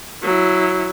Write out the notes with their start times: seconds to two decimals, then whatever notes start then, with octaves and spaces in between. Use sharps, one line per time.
0.22 F#3 E4